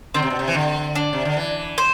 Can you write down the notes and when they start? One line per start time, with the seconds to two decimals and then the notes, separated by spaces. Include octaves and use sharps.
0.14 D3 C4
0.22 C3
0.30 B2
0.39 C3
0.48 E3
0.55 D3
0.95 D4
1.13 C3
1.25 D3
1.37 E3
1.78 C5